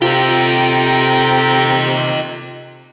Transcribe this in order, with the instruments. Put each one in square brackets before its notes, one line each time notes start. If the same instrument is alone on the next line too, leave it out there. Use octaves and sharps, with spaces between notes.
[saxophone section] C3 [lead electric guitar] D#4 G4 [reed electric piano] F4 [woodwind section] A4 G5 A#5